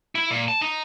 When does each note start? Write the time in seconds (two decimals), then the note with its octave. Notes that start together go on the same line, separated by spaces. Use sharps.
0.15 E4
0.30 A#2
0.48 A5
0.62 D#4